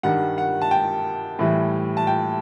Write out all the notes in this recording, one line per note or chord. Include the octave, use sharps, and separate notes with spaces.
G2 D#3 G3 F#5
F#5
A5
G5
A2 E3 G3
A5
G5